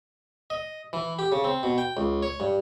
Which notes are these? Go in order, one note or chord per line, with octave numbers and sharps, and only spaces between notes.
D#5
E3
G4
C#3
C4
B2
G5
C#2
C#5
G2